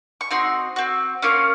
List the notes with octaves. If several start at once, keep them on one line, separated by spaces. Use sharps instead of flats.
C#6
C4 D#4 F#4 C6
C4 F#4
A#3 C#4 F4 C#6